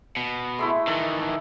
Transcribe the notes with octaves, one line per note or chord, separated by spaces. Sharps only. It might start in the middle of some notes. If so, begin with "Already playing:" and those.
B2
G#3 A3 E4
D#3 E3 A4